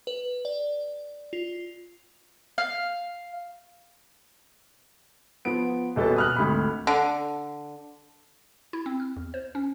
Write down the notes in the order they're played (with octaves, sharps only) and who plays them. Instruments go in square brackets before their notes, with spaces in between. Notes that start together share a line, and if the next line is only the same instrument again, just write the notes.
[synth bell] B4
D5
F4
[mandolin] F5
[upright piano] F3 B3 D7
D#1 B2 A4 B4 A5
D#6 F6 F#6
G#1 D2 B5
[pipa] D3
[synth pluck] E4
C4
F6
E2
C5
C#4